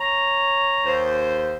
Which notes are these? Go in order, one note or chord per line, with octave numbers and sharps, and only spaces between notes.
C#5 A#5
D#2 C5